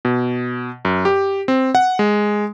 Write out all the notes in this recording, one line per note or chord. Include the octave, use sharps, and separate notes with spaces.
B2
F#2
G4
C4
F#5
G#3